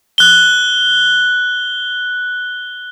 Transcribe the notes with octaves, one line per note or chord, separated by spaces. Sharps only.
F#6 G7